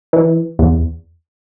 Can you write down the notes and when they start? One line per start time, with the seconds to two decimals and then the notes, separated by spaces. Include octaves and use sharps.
0.13 E3
0.59 E2